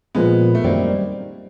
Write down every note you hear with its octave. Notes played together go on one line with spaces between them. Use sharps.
A#2 F3 G#3 B3
A3
F#2 D#3 G3 A#3 C4